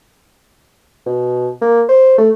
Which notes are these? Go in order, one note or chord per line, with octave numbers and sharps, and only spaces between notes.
B2
A#3
C5
A3